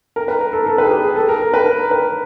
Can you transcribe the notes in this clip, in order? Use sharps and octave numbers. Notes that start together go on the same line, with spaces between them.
A#4
B4
A#4
A4
A4
B4
G#4
G4
G#4
A4
A#4
A#4
B4
A#4
B4